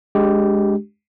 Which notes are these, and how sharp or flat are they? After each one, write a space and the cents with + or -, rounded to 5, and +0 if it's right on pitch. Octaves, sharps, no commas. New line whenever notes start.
G#3 +0 D4 -35 G4 -15